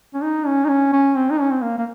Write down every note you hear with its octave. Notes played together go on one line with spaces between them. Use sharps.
C#4
D#4
C#4
D#4
C#4
C#4
C4
D#4
C#4
C4
A#3
A#3